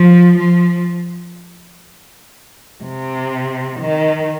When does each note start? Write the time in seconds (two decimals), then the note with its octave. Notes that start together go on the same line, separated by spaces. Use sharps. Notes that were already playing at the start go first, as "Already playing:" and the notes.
Already playing: F3
0.38 F3
2.83 C3
3.80 D#3